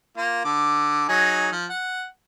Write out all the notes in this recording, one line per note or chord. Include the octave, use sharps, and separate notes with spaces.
A#3 F4
D3 D6
F#3 D#4 G#4
F3
F#5